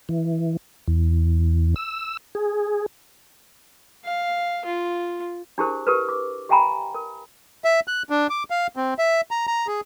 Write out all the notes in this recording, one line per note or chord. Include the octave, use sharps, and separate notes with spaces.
E3
E2
E6
G#4
F5
F4
D4 E4 G4 G#4 A#4 C5
G4 A#4 B4
D6
G4 E5 G5 G#5 A#5 B5
A#4
E5
F#6
D4
D6
F5
C4
E5
A#5
A#5
G#4